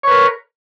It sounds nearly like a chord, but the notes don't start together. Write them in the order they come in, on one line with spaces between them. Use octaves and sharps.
C#5 B4 A#4